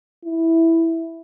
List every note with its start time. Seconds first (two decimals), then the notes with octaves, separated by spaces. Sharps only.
0.24 E4